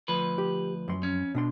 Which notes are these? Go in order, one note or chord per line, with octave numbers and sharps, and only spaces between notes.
D2 F3 B4
G4
F#2 C6
F2 C#4
B2 D4 C6